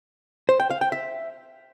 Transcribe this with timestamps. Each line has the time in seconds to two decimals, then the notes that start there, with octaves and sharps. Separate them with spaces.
0.49 C5
0.60 G5
0.70 F5
0.81 G5
0.92 E5